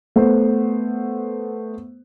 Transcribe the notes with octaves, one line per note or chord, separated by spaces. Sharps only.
A3 B3 C5